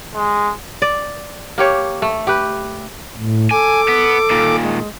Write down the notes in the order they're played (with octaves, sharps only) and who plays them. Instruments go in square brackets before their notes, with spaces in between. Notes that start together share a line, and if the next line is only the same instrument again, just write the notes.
[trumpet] G#3
[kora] D5
A#3 G4 C#5
A3
G4 B4
[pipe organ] A2
[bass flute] A4 [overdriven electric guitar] G#5 [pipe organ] D6
[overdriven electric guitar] B3
A#2 D#3
[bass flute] G#3